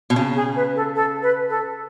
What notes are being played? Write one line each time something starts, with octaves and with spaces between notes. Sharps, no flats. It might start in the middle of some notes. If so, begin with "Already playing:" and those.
B2
C#3
G#4
B4
A4
A4
B4
A4